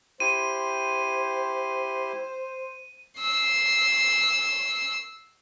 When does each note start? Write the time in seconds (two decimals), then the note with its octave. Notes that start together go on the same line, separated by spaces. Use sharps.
0.20 E4 G4 C5 C6 D#7
3.20 E6 C7